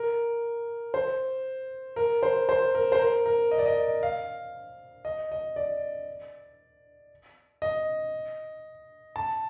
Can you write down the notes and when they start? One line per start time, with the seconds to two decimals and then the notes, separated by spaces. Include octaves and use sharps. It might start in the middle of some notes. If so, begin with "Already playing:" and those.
Already playing: A#4
0.94 C5
1.96 A#4
2.23 C5
2.49 C5
2.75 A#4
2.92 C5
2.99 A#4
3.26 A#4
3.51 D#5
3.58 D5
3.66 D#5
4.03 F5
5.05 D#5
5.32 D#5
5.56 D5
7.62 D#5
9.16 A5